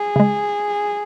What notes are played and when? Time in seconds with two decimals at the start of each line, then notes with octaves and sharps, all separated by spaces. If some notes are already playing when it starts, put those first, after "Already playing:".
Already playing: G#4
0.16 C#3 G#3